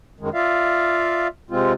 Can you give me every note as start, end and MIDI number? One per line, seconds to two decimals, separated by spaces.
0.20 0.29 42
0.20 0.29 51
0.20 0.29 56
0.34 1.27 65
0.34 1.27 74
0.34 1.27 76
0.34 1.27 77
1.50 1.73 48
1.50 1.73 56
1.50 1.73 60
1.50 1.73 65